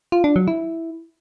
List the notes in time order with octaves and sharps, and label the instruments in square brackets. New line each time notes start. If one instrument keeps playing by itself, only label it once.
[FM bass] F4
D4
F#3
E4